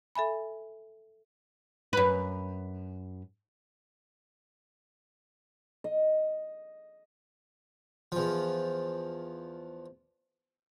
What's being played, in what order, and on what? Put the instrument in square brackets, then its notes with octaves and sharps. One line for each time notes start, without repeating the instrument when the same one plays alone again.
[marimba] A4 E5 G#5 B5
[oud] F#2 B4
[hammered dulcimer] D#5
[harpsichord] E2 F3